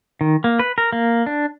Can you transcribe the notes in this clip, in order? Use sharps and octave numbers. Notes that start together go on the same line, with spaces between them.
D#3
A#3
B4
A#4
A#3
D4